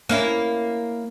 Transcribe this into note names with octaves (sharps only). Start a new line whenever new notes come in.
A#3 C#4 E4